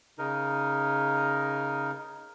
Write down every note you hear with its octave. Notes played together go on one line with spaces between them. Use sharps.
C#3 D#4 A#4